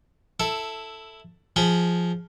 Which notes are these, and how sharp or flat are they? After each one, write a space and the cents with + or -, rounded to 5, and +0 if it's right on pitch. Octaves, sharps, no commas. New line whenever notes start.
E4 +0 A4 +5
F3 +0 G#4 +0 B5 +0